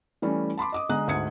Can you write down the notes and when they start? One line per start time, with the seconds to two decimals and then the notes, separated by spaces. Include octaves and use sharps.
0.22 E3 G3 A3 C#4
0.58 A5 B5 C6 D6
0.72 D#5 D6 D#6
0.89 D3 G#3 A#5 D#6 F#6
1.08 D2 G#2 D#6 G#6 C#7